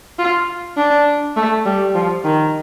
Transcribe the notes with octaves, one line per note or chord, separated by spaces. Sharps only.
F4
D4
A3
G3
F3
D#3